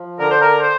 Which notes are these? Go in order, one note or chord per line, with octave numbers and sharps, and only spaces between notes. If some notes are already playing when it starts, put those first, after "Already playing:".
Already playing: F3
D3 A#4
C5
A#4
C5